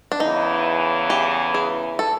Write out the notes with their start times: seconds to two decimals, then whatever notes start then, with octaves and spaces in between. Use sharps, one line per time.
0.12 D4
0.20 E2 C#3 E3 D#4
1.10 G4
1.54 G#4
1.99 A4